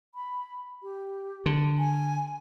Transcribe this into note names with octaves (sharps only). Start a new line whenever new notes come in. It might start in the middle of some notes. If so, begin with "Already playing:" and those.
B5
G4
D3
G#5